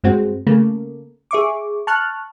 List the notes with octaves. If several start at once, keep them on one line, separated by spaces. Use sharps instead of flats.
G2 G#3 C4 F#4
C#3 A3 A#3
G#4 E5 C#6 D6
A5 C#6 F6 F#6